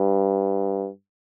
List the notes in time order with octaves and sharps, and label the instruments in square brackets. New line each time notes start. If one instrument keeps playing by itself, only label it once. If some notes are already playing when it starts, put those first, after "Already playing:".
Already playing: [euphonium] G2